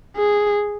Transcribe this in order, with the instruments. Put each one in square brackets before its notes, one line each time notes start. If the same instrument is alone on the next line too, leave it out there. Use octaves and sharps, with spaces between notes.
[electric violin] G#4